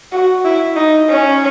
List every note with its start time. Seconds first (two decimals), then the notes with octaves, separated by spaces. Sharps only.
0.12 F#4
0.45 E4
0.76 D#4
1.09 C#4